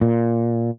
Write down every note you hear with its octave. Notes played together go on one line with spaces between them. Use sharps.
A#2